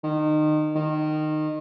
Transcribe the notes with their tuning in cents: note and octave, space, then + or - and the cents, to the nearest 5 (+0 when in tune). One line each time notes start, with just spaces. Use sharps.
D#3 -25
D#3 -20